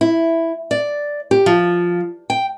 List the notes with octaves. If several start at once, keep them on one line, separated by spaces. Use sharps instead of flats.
E4
D5
G4
F3
G5